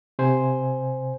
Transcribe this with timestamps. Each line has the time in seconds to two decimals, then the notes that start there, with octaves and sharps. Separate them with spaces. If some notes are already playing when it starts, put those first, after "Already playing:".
0.19 C3 C5 G#5